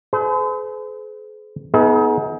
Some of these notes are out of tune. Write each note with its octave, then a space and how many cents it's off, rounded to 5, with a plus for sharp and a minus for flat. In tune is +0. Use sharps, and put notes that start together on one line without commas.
G#4 +45 C5 -45
B3 +0 D#4 +35 G#4 +40